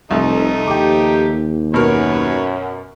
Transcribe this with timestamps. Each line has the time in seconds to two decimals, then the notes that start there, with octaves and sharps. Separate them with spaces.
0.11 F1 C2 A3 D#4
0.68 D#2 F3 G4 G5 D6
1.74 F#2 B2 A#4 B4 C#5